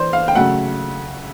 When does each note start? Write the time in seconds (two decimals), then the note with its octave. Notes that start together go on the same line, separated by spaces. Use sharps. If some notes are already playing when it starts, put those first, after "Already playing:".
Already playing: E3 C5 D5
0.13 F5
0.28 G5
0.35 C#3 F#3 A3 F#5